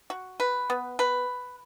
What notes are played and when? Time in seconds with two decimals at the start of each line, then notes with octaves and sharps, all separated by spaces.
0.10 F#4
0.40 B4
0.70 B3
0.99 B4